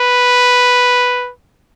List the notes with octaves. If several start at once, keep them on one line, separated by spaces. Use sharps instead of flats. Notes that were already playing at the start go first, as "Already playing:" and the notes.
Already playing: B4